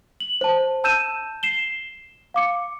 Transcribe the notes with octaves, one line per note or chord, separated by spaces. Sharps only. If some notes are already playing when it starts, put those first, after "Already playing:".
F#7
C5 A5
A5 E6 G6 D#7 E7
C7 E7 G7
F5 D6 C#7